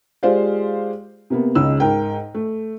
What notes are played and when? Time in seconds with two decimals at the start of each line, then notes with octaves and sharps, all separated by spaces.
0.23 G#3 F4 G4 C5 D5 F5
1.30 C3 A#3 B3
1.55 C#2 C#3 D#4 E6
1.80 G#2 A#4 G5
2.35 A3